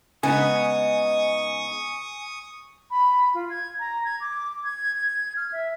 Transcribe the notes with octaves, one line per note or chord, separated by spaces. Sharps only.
C#3 G#3 B3 D#4 G#5 C#6 D#6
B5
F4
G#6
A#5
G#6
D6
G#6
F6
E5